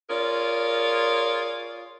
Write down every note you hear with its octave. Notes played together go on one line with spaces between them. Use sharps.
F4 G#4 A#4 C#5 D5